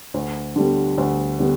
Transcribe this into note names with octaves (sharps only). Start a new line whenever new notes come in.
D2
D3 G3 B3
D2
D3 G3 B3